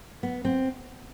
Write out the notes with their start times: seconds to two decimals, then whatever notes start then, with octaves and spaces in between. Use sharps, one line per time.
0.23 B3
0.45 C4